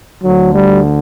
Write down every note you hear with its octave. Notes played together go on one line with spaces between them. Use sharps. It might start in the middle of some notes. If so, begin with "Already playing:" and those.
D2 D3 F#3
G3